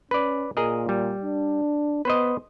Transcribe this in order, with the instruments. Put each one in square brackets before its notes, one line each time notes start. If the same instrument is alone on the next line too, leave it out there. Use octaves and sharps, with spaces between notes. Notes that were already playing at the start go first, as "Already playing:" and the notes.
[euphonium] C#4 [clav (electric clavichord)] B4 D5
[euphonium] A#2 [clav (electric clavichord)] G#4 A#4 D#5
[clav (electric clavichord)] G3
[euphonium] D4
[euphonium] B3 [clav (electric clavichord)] B4 C5 D#5